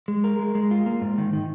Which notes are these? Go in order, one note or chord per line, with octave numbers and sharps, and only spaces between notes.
G#3
A#4
G#3
G#3
F4
A#3
G#2
D#3
D#3